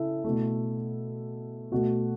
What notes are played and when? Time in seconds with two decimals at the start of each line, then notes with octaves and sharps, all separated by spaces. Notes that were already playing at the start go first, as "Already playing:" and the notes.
Already playing: C#3 E4 A4 E5
0.24 B2 A3
1.72 B2 A3 F#4